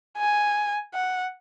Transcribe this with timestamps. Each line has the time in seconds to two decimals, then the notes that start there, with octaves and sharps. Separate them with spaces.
0.18 G#5
0.94 F#5